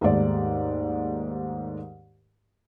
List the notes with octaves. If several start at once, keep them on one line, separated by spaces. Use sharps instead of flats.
D#2 G#2 A3 G4 D5